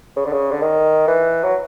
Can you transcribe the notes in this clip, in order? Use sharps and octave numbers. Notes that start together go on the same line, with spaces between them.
C#3
D3
C#3
D3
D#3
E3
F#3